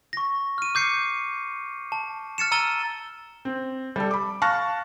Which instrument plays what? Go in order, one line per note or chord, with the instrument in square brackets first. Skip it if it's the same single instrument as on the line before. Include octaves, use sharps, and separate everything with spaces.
[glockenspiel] C#6 A#6
F6 D#7
D6 G6 C7 C#7
A5
F6 A6 C#7 E7
A#5 E6 A6 D#7 E7 G7
[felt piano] C4
G3 A4
B5 D6
F5 A5 C#6 F6 F#6 A#6